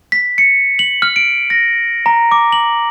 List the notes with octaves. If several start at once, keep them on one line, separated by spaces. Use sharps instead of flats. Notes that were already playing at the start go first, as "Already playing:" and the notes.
B6
C#7
F#7
F6
D7
A#6
A#5
D6
F#7